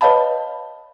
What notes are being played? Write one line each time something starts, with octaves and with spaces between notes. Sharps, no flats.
B4 C#5 D#5 F5 A5 B5